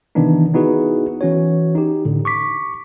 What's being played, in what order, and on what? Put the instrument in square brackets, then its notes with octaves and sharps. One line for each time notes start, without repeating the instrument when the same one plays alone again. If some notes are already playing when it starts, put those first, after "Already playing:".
[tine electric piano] C3 D#3 E3 B3 D4 D#4
B3 D#4 E4 F#4 G#4 B4
E3 C#4 F#4 C#5
D#4 G4
A2 D3
C#6 D6 B6